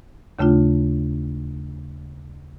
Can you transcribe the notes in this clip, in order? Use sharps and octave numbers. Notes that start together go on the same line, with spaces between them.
D#2 C#3 A3 D4 F4